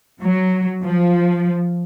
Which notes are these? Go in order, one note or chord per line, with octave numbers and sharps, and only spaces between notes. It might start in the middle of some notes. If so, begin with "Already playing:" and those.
F#3
F3